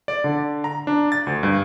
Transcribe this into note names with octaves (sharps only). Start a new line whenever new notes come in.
D5
D3
A#5
D4
A6
D2
G2